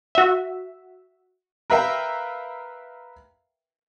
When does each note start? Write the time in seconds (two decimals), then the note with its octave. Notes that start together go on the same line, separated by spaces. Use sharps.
0.15 F#4 E5
1.70 A#4 B4 E5 F5 G5